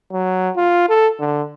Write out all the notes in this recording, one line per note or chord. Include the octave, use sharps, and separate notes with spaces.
F#3
F4
A4
D3